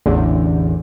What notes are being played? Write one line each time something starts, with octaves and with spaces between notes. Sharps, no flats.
A1 E2 D3